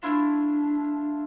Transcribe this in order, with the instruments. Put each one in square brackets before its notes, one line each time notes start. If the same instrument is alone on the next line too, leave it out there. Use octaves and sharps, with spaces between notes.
[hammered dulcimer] A3 E4 F4 [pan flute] D4